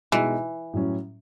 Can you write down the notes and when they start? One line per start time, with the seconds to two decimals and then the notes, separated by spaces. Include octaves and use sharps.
0.12 B2 E3 G#3 D#4 F#4
0.73 A2 F#3 C#4